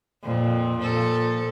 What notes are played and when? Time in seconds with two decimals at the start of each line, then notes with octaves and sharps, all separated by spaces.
0.23 F2 A#2
0.79 A#2 F3 A4